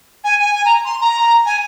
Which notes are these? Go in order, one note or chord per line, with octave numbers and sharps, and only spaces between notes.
G#5
G#5
G#5
A#5
C6
A#5
G#5